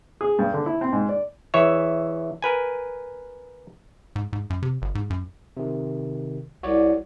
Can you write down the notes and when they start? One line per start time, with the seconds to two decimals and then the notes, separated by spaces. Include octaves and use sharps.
0.21 G#4
0.39 G2
0.54 D3
0.66 E4
0.81 C4
0.93 G#2
1.09 D5
1.54 E2 E3 C#5 E5
2.42 A#4 B4 G#5
4.16 G#2
4.33 G#2
4.50 F#2
4.62 C3
4.82 G1
4.95 G#2
5.10 F#2
5.57 C3 D#3
6.63 C2 F#4 C#5 D5